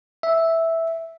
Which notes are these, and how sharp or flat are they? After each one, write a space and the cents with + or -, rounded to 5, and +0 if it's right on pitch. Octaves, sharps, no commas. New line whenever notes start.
E5 -5